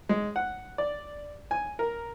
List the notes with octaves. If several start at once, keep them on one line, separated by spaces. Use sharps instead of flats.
G#3
F#5
D5
G#5
A#4